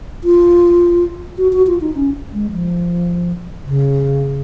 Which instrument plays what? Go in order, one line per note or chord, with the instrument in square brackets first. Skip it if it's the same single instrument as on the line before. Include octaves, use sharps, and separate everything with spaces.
[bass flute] F4
F#4
F#4
F4
D#4
C#4
G#3
F3
C#3